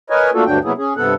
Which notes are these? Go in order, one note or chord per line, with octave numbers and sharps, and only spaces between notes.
A#4 B4 C#5 D#5 G#5
A3 A#3 D4 F4 F#4 A4
D2 G2 D3 F#3 D4 G5
C3 F#3 A#3 B3 E4 G#4
C#4 G#4
G2 C3 B3 A4 F#5